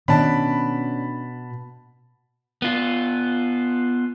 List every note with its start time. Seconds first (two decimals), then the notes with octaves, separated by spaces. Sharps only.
0.08 B2 D#3 C#4 D4 A5 B5
2.62 B3 F4